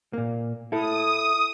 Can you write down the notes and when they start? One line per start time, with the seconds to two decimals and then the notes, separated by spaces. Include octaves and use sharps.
0.13 A#2 A#3
0.72 E4 A4 D#6